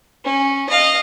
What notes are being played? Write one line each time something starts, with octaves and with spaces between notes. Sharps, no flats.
C#4
D#5 F5